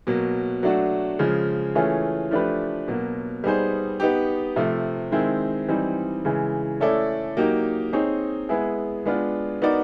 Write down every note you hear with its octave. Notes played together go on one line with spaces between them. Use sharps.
B2 F#3 A#3
F#3 A3 D4 F#4
C#3 F3 G#3
E3 A3 C#4 F4 G#4
F3 A3 D4 G4 B4
B2 F#3 A#3
G3 B3 D#4 G#4 C5
B3 D#4 G4
C3 F3 A3
D#3 G#3 C4 E4
E3 G3 C4 D#4
C#3 E3 G#3
A3 C#4 E4 A4 D5
F#3 A#3 D#4 G4
C4 D#4 G#4 C#5
G#3 B3 E4 G#4
G#3 B3 D4 F4
B3 D#4 F#4 A#4 D5